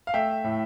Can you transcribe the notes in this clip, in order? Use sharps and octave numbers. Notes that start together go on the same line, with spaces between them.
F5
A3 E5 G5
A2